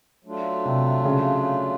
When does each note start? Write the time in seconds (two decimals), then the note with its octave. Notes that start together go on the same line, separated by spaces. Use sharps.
0.25 F#3 A3 D4 F4
0.65 C3
1.05 C#3